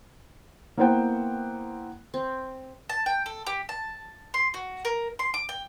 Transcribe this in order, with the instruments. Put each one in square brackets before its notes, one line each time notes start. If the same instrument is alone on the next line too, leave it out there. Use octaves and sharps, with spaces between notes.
[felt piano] A#3 B3 E4 C5 F#5 G5
[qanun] C4
[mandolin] A5
G5
A4
G4
A5
C6
F#4
A#4
C6
D6
G5